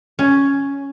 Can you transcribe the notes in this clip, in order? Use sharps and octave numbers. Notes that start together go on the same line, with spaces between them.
C#4